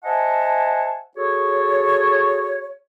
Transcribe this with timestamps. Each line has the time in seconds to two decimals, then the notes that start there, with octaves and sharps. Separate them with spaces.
0.04 C5 D#5 E5 F#5 G#5 A5
1.16 F#4 G#4 A4 C#5